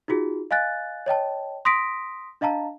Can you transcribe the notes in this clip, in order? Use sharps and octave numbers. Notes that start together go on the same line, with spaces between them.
D#4 F4 F#4 G#4
D#5 F5 G#5 F#6 A6
C#5 D#5 G5 A5
C6 D#6 A#6 B6 D7
D4 D#5 F5 A5 A#5